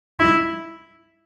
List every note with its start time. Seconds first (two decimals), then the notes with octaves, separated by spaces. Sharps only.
0.20 E4